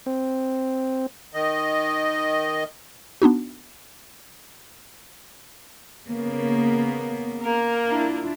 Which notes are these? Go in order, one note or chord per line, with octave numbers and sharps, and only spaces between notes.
C4
D#3 D#5
B3 D4 D#4 F#4
C#3 A#3 B3
A#3 A#4
D4 E4 F4